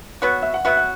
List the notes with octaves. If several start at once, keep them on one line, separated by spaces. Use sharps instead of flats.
F#3 B3 F#4 C#5
E5
F#5
F#3 B3 F#4 E5
F#5